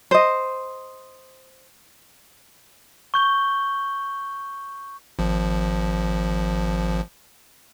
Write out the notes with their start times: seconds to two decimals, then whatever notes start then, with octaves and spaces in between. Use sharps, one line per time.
0.11 C5 D#5
3.14 C#6 G6 G7
5.19 G#1 F3